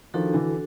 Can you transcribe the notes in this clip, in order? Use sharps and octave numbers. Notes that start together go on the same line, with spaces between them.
D#3 F3 D4 F#4 A4
D3 E3